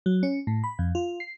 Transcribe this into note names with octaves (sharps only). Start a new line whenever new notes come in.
F#3
C#4
A2
B5
F2
F4
C7